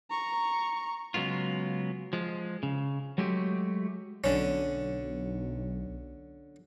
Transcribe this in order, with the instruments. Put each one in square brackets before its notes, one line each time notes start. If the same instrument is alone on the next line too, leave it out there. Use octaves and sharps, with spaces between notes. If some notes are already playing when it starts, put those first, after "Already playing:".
[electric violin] A#5 C#6
[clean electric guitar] C#3 F#3 G#3 B3 F4
F3 G#3
C#3
F#3 G#3 A3 F#4 G4
[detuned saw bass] B1 [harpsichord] D3 C#4